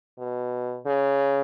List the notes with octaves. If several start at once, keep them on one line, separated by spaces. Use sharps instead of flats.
B2
C#3